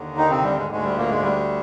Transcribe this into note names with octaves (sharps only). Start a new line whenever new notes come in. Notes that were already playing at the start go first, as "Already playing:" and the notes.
Already playing: D#2 D3
D#3 D#4
C3 C4
G3
G#2 G#3
D2 G#2 D3 G#3
G3
A#2 A#3
G#2 G#3
G3